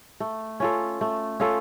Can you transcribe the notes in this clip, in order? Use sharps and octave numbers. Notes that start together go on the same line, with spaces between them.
A3
C#4 F4 A4
A3
C#4 F4 A4